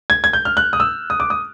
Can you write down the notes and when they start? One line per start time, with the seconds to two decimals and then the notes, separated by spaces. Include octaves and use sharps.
0.10 G#6
0.24 G#6
0.33 G6
0.45 F6
0.57 F#6
0.73 D#6
0.80 E6
1.10 D#6
1.20 D6
1.30 D#6